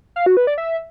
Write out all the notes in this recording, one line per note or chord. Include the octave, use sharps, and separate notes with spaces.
F5
F#4
B4
D5
E5